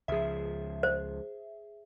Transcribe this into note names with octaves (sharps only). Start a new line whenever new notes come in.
C#2 F3 G#4 E5
C5